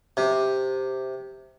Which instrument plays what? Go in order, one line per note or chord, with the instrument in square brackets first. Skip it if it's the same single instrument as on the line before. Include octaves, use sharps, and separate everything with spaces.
[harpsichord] C3